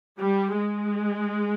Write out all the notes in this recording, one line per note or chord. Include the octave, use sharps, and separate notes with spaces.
G3
G#3